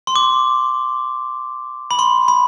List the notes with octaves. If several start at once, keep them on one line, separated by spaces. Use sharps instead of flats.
C6
D6
B5
C6
B5